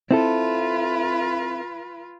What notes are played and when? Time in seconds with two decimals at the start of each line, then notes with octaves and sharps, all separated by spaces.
0.11 C4 E4 F4 A4 B4